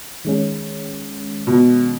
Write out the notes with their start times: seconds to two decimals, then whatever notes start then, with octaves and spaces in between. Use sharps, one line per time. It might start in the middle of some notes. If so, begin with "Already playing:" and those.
0.25 D#3 G#3 C#4
1.47 B2